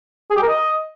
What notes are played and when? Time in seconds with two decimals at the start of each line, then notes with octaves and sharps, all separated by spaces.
0.30 G#4
0.36 G4
0.42 A#4
0.48 D#5